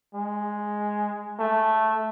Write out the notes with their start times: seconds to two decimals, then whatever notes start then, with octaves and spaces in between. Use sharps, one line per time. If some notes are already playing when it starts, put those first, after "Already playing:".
0.14 G#3
1.39 A3